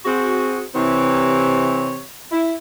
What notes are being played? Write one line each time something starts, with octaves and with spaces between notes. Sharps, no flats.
C4 F#4 G#4
C3 E3 C4 E4 G4 C#5
E4